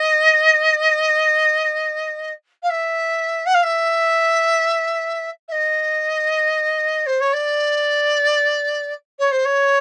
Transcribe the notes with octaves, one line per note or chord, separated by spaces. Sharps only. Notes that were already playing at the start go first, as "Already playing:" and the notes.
Already playing: D#5
F5
E5
F#5
F5
E5
E5
D#5
C5
C#5
D5
C#5
C5
C#5